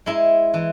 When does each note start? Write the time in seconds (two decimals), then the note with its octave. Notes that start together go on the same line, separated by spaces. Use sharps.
0.06 G#3 E4
0.54 E3